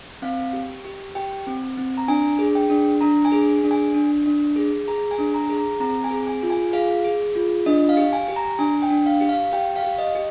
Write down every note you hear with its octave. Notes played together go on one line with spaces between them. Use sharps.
C4 F5
G4
G4
G4 G5
C4
C4
A#5
D4 G#5
G#4
G5
D4
D4 A#5
G#5
G#4
D4
G#5
D4
D4
G#4
G#4 A#5
G#5
D4
A#5
G#4
A#5
C4 A#5
G#5
G#4
G#5
F4
G#5
G#4 F5
G#4
F4
D4 D#5
F5
G4
G#5
G4
A#5
D4 G#5
G5
D4
F5
G4
F5
G4 G5
F5
G4
D#5
G4